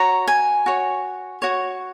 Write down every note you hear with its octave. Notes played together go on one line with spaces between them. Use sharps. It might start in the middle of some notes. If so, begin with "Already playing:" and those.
Already playing: F#4 C#5 A#5
G#5
F#4 C#5
F#4 C#5